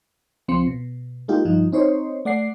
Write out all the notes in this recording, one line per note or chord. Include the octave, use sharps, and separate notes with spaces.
C#2 F3 C4 C6 C#7
B2
G#3 A#3 D#4 F4 G4
G2 F3 D#4
C4 D#4 C5 C#5
A3 D5 F#5 C7